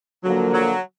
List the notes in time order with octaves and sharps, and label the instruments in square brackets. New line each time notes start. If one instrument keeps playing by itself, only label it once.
[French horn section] D3 F3 A#3 [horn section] F#3
[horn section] F#3